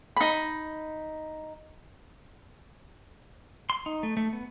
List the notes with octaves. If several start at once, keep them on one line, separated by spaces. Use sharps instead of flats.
D#4 B5
C6
D#4
A3
A3
B3